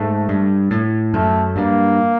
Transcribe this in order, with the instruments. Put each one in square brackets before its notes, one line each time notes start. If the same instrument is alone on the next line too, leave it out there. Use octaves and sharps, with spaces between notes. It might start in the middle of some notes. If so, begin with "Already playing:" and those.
Already playing: [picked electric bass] G#2 [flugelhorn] A3
[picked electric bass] G2
A2
[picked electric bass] F#2 [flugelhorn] A3
[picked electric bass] G2 [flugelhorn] A#3